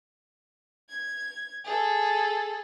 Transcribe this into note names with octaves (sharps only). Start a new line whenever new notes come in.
G#6
G#4 A4